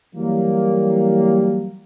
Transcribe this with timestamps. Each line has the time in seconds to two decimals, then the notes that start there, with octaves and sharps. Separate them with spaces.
0.15 E3 F#3 G3 A#3